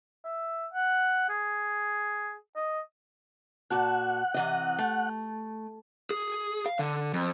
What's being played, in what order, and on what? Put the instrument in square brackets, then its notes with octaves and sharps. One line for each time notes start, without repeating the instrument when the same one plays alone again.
[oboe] E5
F#5
G#4
D#5
[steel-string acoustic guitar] A#2 F#4 A5 [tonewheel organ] F#5
[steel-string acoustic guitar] C3 E3 D#5
A3
[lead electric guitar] G#4
F5
D3
F2